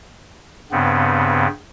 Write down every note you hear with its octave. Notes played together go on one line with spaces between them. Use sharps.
G2 C#3 B3 C4